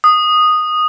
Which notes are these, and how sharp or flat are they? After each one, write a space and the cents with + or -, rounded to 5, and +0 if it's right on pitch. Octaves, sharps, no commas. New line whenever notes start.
D#6 -10